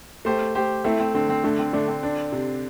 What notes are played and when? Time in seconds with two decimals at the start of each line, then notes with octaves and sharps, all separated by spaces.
0.25 A3 G4 C5
0.55 A3 G4 C5
0.84 A3 C4 E4
1.00 C4
1.14 D3 C4
1.30 C4
1.44 D3 A3
1.59 C4
1.73 D3 A3 D4
1.87 C4
2.03 D4
2.32 C3